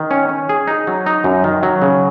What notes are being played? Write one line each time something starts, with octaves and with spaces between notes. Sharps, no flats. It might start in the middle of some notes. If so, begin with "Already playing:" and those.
Already playing: D#3
C#4
C#4
G#4
D#4
F#3
D#4
F#2
D#3
F#3
C#3